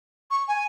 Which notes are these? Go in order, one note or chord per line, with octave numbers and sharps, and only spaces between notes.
C#6
G#5